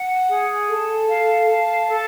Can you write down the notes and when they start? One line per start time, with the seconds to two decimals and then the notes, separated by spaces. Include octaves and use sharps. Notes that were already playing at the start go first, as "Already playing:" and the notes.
Already playing: F#5
0.28 G#4
0.68 A4
1.09 F5
1.49 A5
1.90 A4